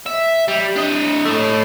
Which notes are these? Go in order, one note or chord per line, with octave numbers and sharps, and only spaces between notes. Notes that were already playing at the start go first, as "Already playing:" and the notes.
E5
G3
D4 D#5
A2 A3